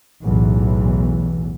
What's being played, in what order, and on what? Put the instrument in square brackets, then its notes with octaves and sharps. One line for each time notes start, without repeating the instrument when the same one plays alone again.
[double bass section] B1 E2 A2 E3